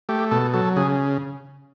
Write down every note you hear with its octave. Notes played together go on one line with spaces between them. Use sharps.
A3 G4
B2 A4
F#3 A4
C#3 G#4